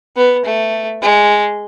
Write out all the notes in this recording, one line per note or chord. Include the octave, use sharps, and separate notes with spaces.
B3
A3
G#3